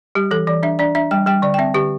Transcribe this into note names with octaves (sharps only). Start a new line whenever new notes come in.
G3 G4
E3 A4
E3 D5
D4 E5
D4 D5
D4 E5
G3 G5
G3 G5
D3 D5
G5
C4 E5
D3 G4